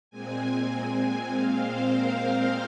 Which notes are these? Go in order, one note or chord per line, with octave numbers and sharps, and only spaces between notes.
A#2 G#3 C4 G#5
A#2 G#3 C4 F5
C5
A#4